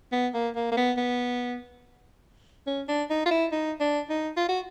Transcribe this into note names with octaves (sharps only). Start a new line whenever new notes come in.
B3
A#3
A#3
A#3
B3
B3
C#4
D4
D#4
F4
E4
D#4
D4
D#4
F4
F#4